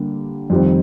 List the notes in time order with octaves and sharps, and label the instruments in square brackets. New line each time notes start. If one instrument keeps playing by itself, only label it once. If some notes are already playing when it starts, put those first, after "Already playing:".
Already playing: [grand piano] D3 G3 A#3
F2 D#3 G3 C4